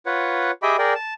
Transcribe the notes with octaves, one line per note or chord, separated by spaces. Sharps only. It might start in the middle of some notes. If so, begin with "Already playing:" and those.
F4 B4 C#5 F#5
G4 G#4 D#5 E5 G5 B5
G#4 A#4 D5 G5
A5